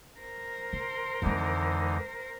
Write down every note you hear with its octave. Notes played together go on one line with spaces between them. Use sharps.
A#4 C5
D3 C6
F2 D3 E3 G#3 D#4